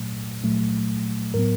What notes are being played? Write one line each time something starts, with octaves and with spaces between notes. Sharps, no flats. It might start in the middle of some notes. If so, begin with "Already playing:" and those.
Already playing: A#2 F#3 A3
A#2 F#3 A3
A2 F#3 B3 A#4